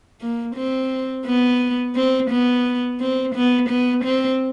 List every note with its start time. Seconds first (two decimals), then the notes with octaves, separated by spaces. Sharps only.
0.21 A#3
0.56 C4
1.26 B3
1.96 C4
2.31 B3
3.01 C4
3.35 B3
3.70 B3
4.04 C4